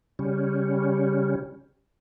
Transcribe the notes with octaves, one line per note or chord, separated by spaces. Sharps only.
C#3 G3 C#4